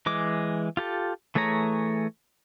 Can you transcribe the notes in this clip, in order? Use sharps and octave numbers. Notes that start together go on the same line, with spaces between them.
E3 G#3 D6
F4 G4 A4
E3 A3 G#4 C#5 A#5